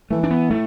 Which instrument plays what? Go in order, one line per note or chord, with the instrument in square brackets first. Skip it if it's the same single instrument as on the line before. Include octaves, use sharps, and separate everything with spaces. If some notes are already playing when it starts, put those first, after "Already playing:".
[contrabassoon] E3 [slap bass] A3
[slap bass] D4
B3
[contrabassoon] A2 [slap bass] A3